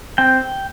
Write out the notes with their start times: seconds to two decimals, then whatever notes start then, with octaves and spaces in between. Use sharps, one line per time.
0.18 C4 G5